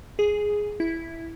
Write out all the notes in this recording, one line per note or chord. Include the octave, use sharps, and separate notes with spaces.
G#4
E4